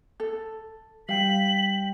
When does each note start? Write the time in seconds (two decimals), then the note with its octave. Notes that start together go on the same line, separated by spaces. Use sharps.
0.20 A4
1.09 G3 F5 G5 B6 F#7